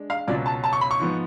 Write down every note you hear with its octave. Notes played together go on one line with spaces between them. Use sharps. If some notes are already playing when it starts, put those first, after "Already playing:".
Already playing: G#3 D4
F5
C#2 B2 F#3 C#4 F4 D5
A5
A5
C#6
B5
C#6
G#2 F3 B3